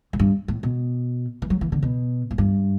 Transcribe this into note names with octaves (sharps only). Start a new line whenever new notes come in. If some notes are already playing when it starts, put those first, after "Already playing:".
A2
G2
A2
B2
E3
F#3
E3
D3
B2
A2
G2